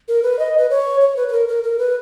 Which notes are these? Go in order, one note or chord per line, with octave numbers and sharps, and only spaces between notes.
A#4
B4
D#5
B4
C#5
C#5
B4
B4
A#4
A#4
A#4
B4